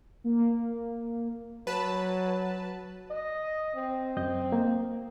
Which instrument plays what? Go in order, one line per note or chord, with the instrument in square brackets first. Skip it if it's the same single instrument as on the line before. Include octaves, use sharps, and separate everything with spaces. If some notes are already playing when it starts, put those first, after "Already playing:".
[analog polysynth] A#3
[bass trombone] F#3 [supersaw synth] B4 A5
[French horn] D#5
C4
[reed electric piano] F#2 D#5 G6
A#3